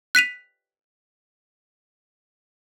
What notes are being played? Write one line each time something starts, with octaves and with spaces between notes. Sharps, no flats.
F#6 B6 D#7 F7